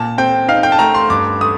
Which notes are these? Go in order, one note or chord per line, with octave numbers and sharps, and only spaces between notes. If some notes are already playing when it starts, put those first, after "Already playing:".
Already playing: A#2 A5
C4 G5
D#4 F5
G5
A5
A3 A#5
C6
G2 D6
A3 D#6